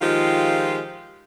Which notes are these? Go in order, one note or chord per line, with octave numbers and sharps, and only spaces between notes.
D#3 F3 G#3 F4 G4